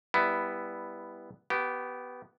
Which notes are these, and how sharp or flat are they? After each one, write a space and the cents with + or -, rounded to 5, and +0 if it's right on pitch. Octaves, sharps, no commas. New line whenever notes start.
G3 +20 B3 +0 E4 +0
B3 +0 G4 -20